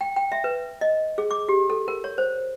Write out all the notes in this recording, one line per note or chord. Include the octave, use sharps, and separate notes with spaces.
G5
G5
E5
B4
D#5
G#4
D6
G4
A4
A#4
C#5
C5